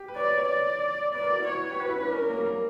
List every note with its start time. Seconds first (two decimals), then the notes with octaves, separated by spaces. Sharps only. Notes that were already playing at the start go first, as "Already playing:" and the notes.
Already playing: G4
0.08 B4
0.16 C#5 D5
0.26 B4
0.38 C#5
0.49 D5
1.14 B4 D5
1.22 A#4
1.30 F#4
1.39 E4
1.47 F#4 C#5
1.63 B4
1.71 G4
1.80 F#4 B4
1.89 E4
1.96 C#4
2.05 D4
2.12 C#4 A#4
2.30 A#3
2.37 G3
2.45 A#3